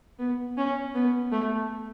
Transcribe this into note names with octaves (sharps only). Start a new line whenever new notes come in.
B3
C#4
B3
A3